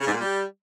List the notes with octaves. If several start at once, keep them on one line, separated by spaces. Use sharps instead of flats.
C#3
G#2
A#2
G3